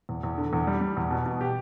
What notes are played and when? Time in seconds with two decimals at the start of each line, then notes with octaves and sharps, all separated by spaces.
0.09 E2
0.23 E2
0.38 D3
0.53 E2
0.67 G3
0.81 G3
0.97 E2
1.10 B2
1.26 B2
1.41 G4